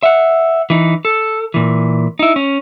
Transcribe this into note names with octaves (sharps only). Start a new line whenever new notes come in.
E5 F#5
E3 D#4
A4
A#2 E3
D#4 E4
C#4